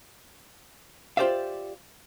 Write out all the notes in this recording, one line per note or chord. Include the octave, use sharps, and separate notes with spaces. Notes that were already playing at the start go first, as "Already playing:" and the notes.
F4 G4 C5 D5 E5 F5